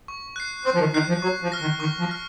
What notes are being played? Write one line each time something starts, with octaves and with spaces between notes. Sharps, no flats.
C#6
F#6 C7
C4 C#6
F3
D#3
D#3 F#6 C7
F3
F#3 C#6
F3
F6 A#6
D#3
D#3 C#6
F3
F6 A#6